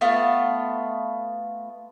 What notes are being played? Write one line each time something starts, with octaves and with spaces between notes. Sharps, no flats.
A3 B3 F4